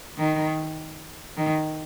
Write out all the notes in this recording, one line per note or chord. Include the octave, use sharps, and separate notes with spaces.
D#3
D#3